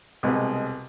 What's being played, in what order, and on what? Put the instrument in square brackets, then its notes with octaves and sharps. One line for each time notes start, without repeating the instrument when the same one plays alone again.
[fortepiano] C2 B2 G#3 B3